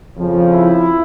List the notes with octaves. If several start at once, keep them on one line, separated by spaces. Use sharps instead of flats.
F2 C#3 F3
E4